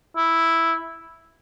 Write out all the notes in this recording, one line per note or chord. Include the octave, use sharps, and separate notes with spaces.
E4